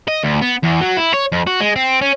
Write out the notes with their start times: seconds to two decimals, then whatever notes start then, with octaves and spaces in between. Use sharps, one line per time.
0.08 D#5
0.24 D2
0.42 B3
0.64 E2
0.81 F#3
0.97 E4
1.14 C#5
1.32 F2
1.47 F#4
1.61 G#3
1.76 C4
2.01 C#4